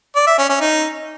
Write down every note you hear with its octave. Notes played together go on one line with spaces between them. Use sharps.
D5
E5
C#4
C#4
D#4